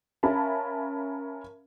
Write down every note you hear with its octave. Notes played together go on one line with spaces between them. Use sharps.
C#4 A#4 E5 F5 A5 B5